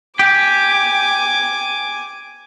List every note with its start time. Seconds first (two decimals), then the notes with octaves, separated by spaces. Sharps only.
0.19 G4 G#5 D6